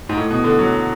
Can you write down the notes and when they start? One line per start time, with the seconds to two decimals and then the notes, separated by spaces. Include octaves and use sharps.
0.09 G#2
0.17 A2
0.30 B2
0.44 D3
0.59 F#3